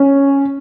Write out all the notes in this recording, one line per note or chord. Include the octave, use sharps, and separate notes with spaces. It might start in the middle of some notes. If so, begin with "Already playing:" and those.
Already playing: C#4